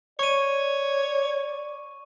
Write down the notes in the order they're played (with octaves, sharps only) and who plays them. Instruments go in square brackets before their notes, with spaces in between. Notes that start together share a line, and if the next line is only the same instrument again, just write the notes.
[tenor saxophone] C#5 [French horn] D5 [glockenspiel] C#6 D#7